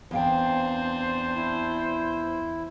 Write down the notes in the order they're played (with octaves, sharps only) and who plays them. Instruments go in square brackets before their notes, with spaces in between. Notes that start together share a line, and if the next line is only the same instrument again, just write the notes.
[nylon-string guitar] E2 F5 G5 [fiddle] C4 D4 [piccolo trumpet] C5
[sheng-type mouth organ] E4